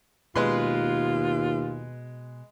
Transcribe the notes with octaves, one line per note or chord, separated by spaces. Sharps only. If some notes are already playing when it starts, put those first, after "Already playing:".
D#2 B2 G#3 F4 B4 C6